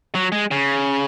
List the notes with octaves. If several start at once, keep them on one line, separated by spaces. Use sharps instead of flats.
F#3
G#3
C#3